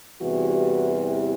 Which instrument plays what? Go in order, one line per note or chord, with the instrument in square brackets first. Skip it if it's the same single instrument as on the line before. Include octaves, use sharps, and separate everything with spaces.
[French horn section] E2 C3 E3 G3 F#4